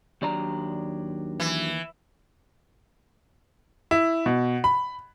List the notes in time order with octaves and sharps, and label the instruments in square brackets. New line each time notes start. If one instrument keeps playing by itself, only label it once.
[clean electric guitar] D#2 D5 A#5 [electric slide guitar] F#3 D4 G4
[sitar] E3
[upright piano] E4
B2
B5